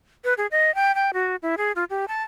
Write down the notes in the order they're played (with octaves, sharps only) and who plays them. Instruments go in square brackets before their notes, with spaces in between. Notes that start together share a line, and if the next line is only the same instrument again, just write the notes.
[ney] B4
G#4
D#5
G5
G5
F#4
E4
G#4
F4
G4
A5